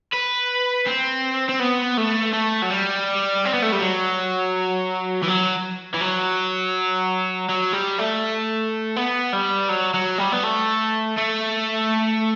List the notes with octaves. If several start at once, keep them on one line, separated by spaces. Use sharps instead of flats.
B4
C4
C4
B3
A3
A3
F#3
G3
C4
B3
A3
G3
F#3
E3
F#3
E3
F#3
F#3
G3
A3
B3
G3
F#3
F#3
G3
B3
A3
A3